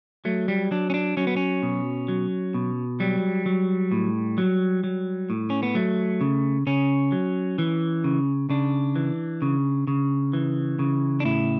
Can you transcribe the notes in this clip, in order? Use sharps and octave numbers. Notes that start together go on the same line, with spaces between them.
F#3 A3
G3
F#3 D4
C#4
D4
F#3 C#4
B3
C#4
B2
F#3
B2
F#3 G3
F#3
A2
F#3
F#3
A2
C#4
B3
F#3 A3
C#3
C#3 C#4
F#3
E3
C#3
C#3 D4
E3
C#3
C#3
E3
C#3
D4
A2 E4